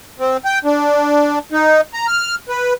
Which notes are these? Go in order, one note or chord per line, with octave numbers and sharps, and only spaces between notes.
C4
G5
D4
D#4
A#5
F6
B4